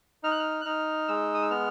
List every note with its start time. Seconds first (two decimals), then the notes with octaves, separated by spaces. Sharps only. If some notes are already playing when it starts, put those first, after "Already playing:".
0.23 D#4 F6
0.32 F#6
0.39 F6
0.61 F#6
0.65 D#4 F6
1.08 G#3 E6
1.34 D#6
1.42 E6
1.50 B3 F6